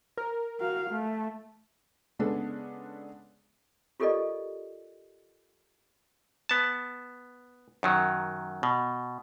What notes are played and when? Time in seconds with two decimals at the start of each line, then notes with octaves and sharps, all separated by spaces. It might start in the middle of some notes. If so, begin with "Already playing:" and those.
0.18 A#4
0.60 F#4 F5
0.90 A3
2.19 C#3 G#3 B3 D4 G#4 A4
4.00 F4 G4 A4 A#4 D5 D#5
6.49 B3 A5
7.83 F#2 D#3 F#3
8.63 B2